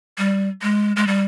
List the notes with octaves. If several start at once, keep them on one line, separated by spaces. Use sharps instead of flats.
G3
G#3
G#3
G3